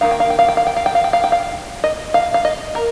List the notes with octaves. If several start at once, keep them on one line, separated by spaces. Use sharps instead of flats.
D#3 A#3 D#4 F5
G5
F5
G5
F5
G5
F5
G5
F5
G5
F5
G5
F5
G5
F5
D#5
F5
F5
D#5
A#4